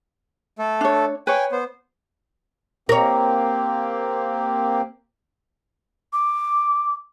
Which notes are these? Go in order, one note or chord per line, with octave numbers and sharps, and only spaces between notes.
A3 A4
D4 C#5
B4 C#5 G5 G#5
B3 C5
A#3 C4 G4 A#4 C#5
D6